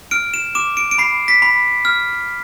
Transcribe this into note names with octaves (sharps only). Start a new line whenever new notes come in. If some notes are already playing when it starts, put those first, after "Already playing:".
F6 D7
E7
D6 E7
D7
D7
B5 C7
B6
B5
F6